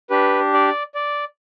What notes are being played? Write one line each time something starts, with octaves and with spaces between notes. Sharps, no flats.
D4 G4 B4
D5
D5